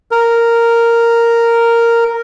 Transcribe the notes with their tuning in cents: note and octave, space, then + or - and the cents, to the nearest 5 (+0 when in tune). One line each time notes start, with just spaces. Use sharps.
A#4 -5